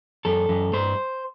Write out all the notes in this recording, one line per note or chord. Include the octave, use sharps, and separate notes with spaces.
F#2 A4
F#2
G2 C5